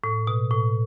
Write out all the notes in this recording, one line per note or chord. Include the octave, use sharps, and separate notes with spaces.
A2
B2
A2